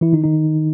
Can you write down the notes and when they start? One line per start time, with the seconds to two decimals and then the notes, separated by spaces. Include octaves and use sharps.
0.01 E3 E4
0.13 D#3 D#4
0.24 D#3 D#4